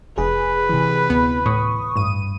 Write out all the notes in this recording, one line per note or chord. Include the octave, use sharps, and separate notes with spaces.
F1 G#4 B4
C3 E3
D2 B3
A2 C#6 D#6
A1 G2 D#7